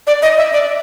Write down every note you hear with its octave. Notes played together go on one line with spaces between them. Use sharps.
D5
D#5
E5
D5